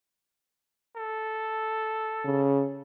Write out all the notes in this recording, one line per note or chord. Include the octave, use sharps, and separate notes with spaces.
A4
C#3